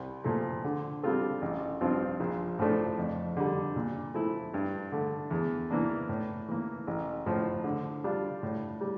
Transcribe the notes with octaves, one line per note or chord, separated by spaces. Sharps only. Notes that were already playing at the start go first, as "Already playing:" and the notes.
Already playing: C2
A#2 F3 A3
D3
G3 C4 F4 A4
A1
G2 F3 C4 F4
A#1
A2 F3 A3 D4
F2
D3 G3
A#2
F3 A3 E4
G2
D3 A3
E2
E3 A#3 D4
A2
E3 A#3
A1
A2 F3
D3
G3 D4 F4
A2
G3